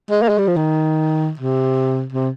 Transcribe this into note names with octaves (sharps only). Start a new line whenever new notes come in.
G#3
A#3
G#3
G3
F3
D#3
C3
C3